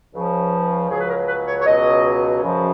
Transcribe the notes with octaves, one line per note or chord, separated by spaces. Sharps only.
C#2 C#3 F3
C#2 C#3 F#3 G#4
B4
A#4
B4
C#5
C#5
C#2 B2 F#3 D#5
F#2 C#3 F3